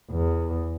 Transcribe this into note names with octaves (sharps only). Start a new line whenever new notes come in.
E2